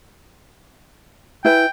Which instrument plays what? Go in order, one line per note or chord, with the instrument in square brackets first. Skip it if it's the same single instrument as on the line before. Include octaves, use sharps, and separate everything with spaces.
[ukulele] E4 B4 G#5 [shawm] G5